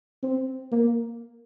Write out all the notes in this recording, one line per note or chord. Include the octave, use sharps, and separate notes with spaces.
C4
A#3